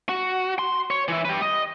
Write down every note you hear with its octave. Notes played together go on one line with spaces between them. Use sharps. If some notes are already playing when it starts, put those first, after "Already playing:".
F#4
C6
C#5
E3 E4
G4 B4
D#5